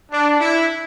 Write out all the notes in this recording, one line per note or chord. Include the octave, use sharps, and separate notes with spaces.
D4
E4